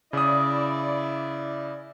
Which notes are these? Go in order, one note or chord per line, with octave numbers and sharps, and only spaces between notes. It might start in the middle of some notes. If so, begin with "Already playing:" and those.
C#3 E4 D5 D#6